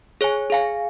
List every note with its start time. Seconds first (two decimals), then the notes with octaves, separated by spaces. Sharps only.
0.21 G#4 C#5 G#5
0.50 G#4 F5 G#5